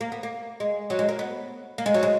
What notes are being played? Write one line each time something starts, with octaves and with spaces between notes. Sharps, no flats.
A#3
B3
A#3
G#3
F#3
G#3
A#3
B3
A#3
G#3
F#3
G#3